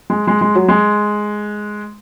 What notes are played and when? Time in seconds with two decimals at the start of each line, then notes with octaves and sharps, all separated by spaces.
0.10 G#3
0.27 G#3
0.41 G#3
0.55 F#3
0.68 G#3